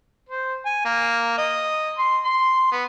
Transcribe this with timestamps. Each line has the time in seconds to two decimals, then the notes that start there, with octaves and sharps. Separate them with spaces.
0.29 C5
0.66 G#5
0.85 A#3
1.38 D#5
1.98 C6
2.25 C6
2.72 B3